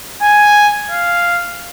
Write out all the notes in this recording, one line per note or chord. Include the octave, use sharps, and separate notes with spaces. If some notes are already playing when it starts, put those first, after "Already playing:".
G#5
F5